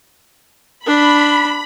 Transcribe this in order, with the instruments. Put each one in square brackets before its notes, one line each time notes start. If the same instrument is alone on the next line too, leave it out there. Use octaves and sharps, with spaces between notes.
[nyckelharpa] D4 [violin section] B5